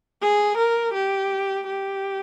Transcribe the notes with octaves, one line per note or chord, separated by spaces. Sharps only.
G#4
A#4
G4
G4